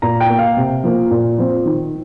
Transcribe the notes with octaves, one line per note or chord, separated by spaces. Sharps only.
A#2 A#5
G5
A#3
F5
C3
F3 A#3
A#2
F3 C4
D#3